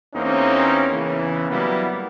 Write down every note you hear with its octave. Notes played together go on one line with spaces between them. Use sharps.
E2 A#3 C4 C#4 D#4
E2 C#3 E3
F#3 G3 A#3 B3 E4